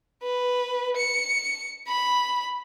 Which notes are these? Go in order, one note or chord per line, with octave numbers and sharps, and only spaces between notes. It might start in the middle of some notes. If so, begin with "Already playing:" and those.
B4
C#7
B5